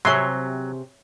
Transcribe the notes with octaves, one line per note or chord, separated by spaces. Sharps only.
C3 F#3 G#4 C#5 E5 C6